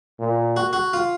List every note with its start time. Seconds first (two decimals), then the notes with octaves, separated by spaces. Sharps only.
0.20 A#2
0.56 F#4
0.73 F#4
0.93 F4